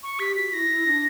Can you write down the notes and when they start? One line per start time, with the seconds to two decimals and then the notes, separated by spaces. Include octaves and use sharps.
0.03 C#6
0.19 G4 B6
0.36 F#4 B6
0.53 E4 A#6
0.69 E4
0.87 D4